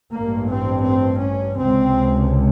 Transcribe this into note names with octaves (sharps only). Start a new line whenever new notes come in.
A1 G2 A#3
C4
C4
C#4
C#2 C3 C4